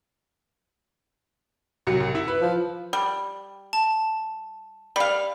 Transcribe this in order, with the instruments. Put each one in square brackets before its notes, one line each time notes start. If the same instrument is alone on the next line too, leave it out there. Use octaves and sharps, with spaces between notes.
[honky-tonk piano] C2 F#3 C#7
C2
E4
B4
[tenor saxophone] F3
[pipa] G3
[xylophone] A5
[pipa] G3 F5 [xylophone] B5